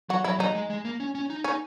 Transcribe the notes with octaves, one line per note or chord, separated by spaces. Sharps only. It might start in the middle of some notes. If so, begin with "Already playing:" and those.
F#3 F#4
F#3 E4
F#3 D#4
G#3
G#3
A#3
C#4
C#4
D#4
C#4 D#4